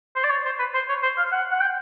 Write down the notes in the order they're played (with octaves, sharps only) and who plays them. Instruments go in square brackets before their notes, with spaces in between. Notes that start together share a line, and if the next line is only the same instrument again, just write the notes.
[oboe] C5
D5
C#5
C5
B4
C5
C#5
C5
F5
F#5
F#5
G5